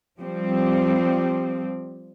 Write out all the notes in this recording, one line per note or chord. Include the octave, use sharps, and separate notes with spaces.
F3 G3 C4